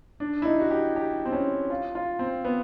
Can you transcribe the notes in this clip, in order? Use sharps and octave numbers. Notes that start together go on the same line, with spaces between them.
D4
E4
D#4
F#4
G4
G4
C4
C#4
F4
F4
C4
B3